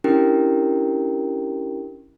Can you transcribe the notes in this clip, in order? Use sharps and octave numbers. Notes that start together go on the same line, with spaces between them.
C#4 D4 E4 G4 A#4 G5